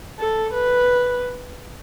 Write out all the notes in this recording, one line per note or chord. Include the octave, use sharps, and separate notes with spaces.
A4
B4